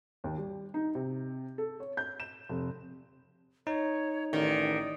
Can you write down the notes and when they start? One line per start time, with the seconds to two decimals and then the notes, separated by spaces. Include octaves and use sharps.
0.24 D#2
0.38 G3
0.74 D#4
0.95 C3
1.58 A4
1.80 C#5
1.97 G6
2.20 E7
2.49 F1
3.67 D#4 C#5
4.33 A1 D#3 D5